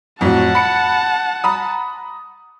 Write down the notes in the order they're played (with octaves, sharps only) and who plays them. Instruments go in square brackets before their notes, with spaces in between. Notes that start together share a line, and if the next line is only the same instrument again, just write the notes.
[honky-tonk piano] F2 A2 F#3 [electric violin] F#5 A5
[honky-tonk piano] B5 C#7
A#5 B5 D#6